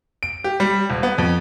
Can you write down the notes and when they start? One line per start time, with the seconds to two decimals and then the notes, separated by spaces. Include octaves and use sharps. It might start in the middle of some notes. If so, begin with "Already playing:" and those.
0.23 D7
0.44 G4
0.60 G3
0.90 D#1
1.03 B3
1.18 F2